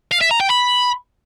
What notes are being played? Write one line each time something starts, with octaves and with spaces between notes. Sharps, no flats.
F5
E5
A#5
G5
B5